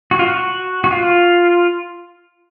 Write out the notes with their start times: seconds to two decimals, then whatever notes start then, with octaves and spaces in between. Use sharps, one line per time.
0.11 F#4
0.19 F4
0.27 F#4
0.84 F#4
0.91 F4